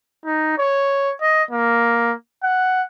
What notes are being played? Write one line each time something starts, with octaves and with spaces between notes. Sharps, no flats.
D#4
C#5
D#5
A#3
F#5